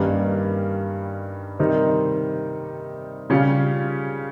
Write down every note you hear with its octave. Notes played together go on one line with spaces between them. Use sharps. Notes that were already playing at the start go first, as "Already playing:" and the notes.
Already playing: G2 D#3 G3 A#3 C#4
C3 D#3 G3 C4 D#4
C#3 G3 C#4 F4